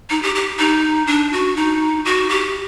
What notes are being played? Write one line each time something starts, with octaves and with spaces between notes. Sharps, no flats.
D#4
G4
G4
D#4
D4
F#4
D#4
F#4
G4